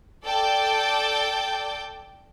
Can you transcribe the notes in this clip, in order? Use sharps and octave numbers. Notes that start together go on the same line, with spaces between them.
A4 D5 G5 A5 G6